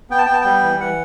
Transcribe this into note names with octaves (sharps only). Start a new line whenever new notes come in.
B3 G5
A5
B3 G5
A5
G3 G5
E3
E3 F#5